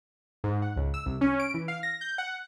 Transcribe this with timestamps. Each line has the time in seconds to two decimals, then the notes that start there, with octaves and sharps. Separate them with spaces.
0.44 G#2
0.62 F#5
0.76 C#2
0.94 E6
1.06 C2
1.21 C#4
1.40 D7
1.54 E3
1.68 F5
1.83 A#6
2.01 G6
2.18 F#5